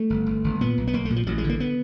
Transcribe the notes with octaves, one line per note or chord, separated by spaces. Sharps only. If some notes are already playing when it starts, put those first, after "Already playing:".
Already playing: A3
G1
G1
G1
A#2 B3
B1
B3
B1 A#3
A3
A#2
F3
A1 F#3
G#3
D3
A#3
B3